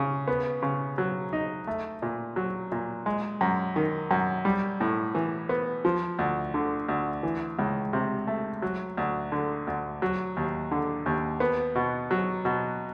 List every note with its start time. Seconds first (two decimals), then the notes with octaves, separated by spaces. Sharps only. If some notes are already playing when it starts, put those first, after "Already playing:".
Already playing: C#3
0.28 B3
0.62 C#3
0.98 F#3
1.33 D#4
1.67 A3
2.02 A#2
2.36 F#3
2.72 A#2
3.06 G#3
3.41 F#2
3.76 D#3
4.11 F#2
4.45 G3
4.81 A2
5.15 E3
5.49 B3
5.85 F3
6.19 D2
6.54 D3
6.88 D2
7.23 E3
7.59 C#2
7.93 C3
8.27 A3
8.62 F#3
8.97 D2
9.32 D3
9.67 D2
10.02 F#3
10.37 D#2
10.71 D3
11.06 D#2
11.40 B3
11.75 B2
12.11 F#3
12.45 B2